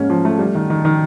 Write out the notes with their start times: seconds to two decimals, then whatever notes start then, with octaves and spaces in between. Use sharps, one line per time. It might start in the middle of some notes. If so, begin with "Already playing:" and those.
Already playing: G#2 A#3 C#4
0.10 F3
0.25 A3
0.39 G3
0.55 D#3
0.70 D#3
0.85 D#3